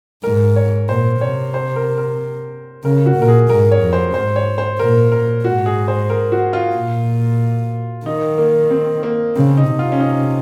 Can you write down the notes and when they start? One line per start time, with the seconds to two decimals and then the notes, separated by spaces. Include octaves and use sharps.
0.24 G#2 A#4
0.56 C#5
0.89 A#2 C5
1.21 C3 C#5
1.54 C5
1.76 A#4
1.98 A#4
2.84 C#3 A#4
3.06 F#4
3.16 A#2
3.22 A#4
3.28 G#4
3.50 G#2 A#4
3.71 C#5
3.82 F2
3.93 C5
4.14 G#2 C5
4.36 C#5
4.58 C5
4.79 A#2 A#4
5.12 A#4
5.45 G#2 F#4
5.66 G#4
5.88 C5
6.10 A#4
6.32 F#4
6.53 F4
6.75 A#2
8.06 D#3 D#4
8.38 A#3
8.70 C4
9.03 A#3
9.36 C#3 C4
9.57 D#4
9.69 C3
9.79 F4
9.92 C#4
10.00 D#4